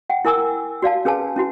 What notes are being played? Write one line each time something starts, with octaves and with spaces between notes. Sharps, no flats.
F#5 G5
E4 A#4 G#5 D6 E6
F#4 D5 F5 A5
C#4 G#4 B4 G#5 A5
C#4 E4 F#4